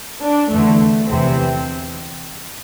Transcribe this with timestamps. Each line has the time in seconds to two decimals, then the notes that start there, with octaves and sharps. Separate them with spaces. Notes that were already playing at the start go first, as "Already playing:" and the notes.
0.22 D4
0.51 E2 D3 A3
1.09 E2 C3 E3 C4